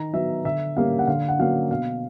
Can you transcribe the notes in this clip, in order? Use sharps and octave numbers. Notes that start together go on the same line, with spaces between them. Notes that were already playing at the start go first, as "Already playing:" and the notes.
Already playing: D#3 A#5
F#3 B3 E5
D3 E5
G3 A#3 C#4 F5
F#5
D3 F5
F#5
F#3 A#3 C#4 F5
B2 F5